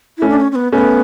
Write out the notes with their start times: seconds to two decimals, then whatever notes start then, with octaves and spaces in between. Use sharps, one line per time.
0.18 A3 C#4 E4
0.29 D4
0.39 C#4
0.52 C#4
0.55 B3
0.72 A3 B3 C#4